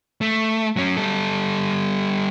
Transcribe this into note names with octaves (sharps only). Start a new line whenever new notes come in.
A3
F#3 C#4
G3 A4